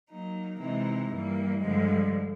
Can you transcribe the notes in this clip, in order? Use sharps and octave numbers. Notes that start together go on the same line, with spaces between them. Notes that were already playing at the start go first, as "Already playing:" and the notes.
F#3 A#3 D#4
C3 E3 G#3 C4 D#4
G2 E3 G3 A#3
G2 D3 F3 G#3